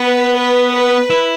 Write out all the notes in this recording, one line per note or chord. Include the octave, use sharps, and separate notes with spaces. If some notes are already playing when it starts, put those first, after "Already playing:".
Already playing: B3 B4
B4
B4
E4